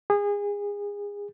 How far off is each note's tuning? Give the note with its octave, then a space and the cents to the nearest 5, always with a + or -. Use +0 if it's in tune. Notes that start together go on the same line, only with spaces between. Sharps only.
G#4 -30